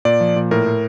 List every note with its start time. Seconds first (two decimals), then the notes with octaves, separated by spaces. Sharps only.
0.05 A#2 D5
0.21 F3
0.36 A#2
0.51 A2 A#4
0.66 A2